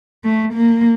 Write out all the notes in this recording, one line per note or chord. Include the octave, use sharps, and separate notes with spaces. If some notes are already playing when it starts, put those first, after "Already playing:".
A3
A#3